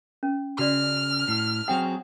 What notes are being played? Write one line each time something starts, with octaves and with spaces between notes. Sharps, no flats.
C#4
C#3 F#4 D5 F6
A2
F#3 C4 G#4 F#5 G5 D#6